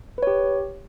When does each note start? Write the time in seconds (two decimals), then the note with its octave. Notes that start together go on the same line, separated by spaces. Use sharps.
0.18 B4
0.23 C#5
0.27 G4